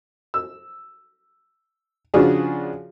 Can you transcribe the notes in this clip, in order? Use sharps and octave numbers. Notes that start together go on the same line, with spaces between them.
E6
C#3 F3 D4 F4 F#4 G#4